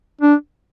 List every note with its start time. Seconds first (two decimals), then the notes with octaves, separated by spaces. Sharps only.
0.21 D4